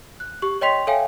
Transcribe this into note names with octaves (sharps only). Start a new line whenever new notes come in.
F#6
G4 C#6
C#5 D#5 G5 C6 B6 F7
A4 C#5 E5 F5 G5 G#5